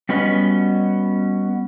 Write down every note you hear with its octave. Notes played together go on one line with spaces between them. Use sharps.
G3 B3 C#4 F#4 B4 D#5